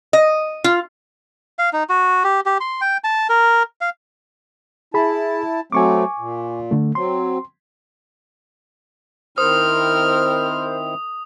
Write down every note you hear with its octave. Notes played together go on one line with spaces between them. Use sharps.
D#5
F4
F5
D#4
F#4
G4
G4
C6
G5
A5
A#4
F5
E4 G#4 A5 B5
F#3 A3 C4 G#5 C#6 D6
A#2
D3 A3
F#3 C4 C6
D#3 C4 E4 A#4 C5 D#6 F6